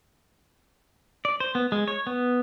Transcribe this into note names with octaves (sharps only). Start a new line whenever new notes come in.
D5
C5
B3
G#3
C#5
B3